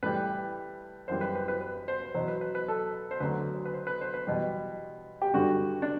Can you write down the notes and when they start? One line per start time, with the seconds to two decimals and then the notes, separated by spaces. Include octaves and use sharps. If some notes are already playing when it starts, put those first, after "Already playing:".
0.03 A2 E3 G3 B4
1.08 F#2 E3 G3 C5
1.21 B4
1.35 B4
1.48 B4
1.61 B4
1.88 C5
2.15 E2 B2 F#3 C5
2.28 B4
2.41 B4
2.55 B4
2.68 A4
3.11 C5
3.20 D2 D3 F#3 B4
3.65 B4
3.74 C5
3.87 B4
4.01 C5
4.14 B4
4.27 E2 B2 G3
5.22 G4
5.33 G2 D3 G3 F#4
5.82 D4